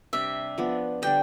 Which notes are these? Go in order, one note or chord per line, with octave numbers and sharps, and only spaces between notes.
C3 G3 D4 E5
F3 B3 D4
D3 G3 D4 G5